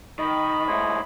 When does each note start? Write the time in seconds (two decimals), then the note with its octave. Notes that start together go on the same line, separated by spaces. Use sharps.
0.19 D#3 D#5 B5
0.68 G#2 E4 C5 C#5 D#5